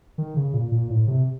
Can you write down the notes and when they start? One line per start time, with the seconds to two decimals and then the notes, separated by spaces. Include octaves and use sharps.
0.18 D#3
0.36 C#3
0.53 A#2
0.72 A#2
0.90 A2
1.07 C3